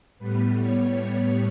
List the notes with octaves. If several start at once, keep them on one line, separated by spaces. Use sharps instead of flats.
A2 G3 B3 B4
C#5